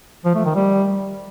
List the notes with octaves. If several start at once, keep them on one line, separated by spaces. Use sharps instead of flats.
F3
A3
D#3
G3